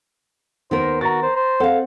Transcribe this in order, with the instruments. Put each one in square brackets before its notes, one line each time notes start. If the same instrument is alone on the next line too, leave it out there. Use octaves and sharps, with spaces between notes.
[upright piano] D#2 [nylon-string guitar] D#3 B3 A#4 [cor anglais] C5
[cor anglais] F#4 [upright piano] A#5 A6
[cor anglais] C5
C5
[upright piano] C4 F#5 [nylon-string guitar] A4 F5